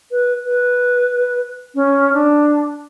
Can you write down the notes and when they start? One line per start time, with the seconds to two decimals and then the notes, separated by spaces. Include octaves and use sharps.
0.11 B4
0.45 B4
1.75 C#4
2.14 D4